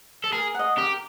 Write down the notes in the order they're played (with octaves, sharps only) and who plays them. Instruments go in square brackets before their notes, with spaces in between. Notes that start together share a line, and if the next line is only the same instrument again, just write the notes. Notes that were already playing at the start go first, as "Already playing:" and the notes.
[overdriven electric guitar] A4
[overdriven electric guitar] G#4 [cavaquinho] A#4
[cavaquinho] D#5 F#5
[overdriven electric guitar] G4 [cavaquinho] A#4